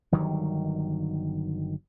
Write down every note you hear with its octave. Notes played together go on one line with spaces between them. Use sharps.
G1 D#3 F#3 G3